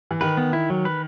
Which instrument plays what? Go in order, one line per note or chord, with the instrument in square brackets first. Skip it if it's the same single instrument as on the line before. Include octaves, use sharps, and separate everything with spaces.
[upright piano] E3
[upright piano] D#3 [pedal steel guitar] B4
[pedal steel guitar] B3
E4
F#3
B4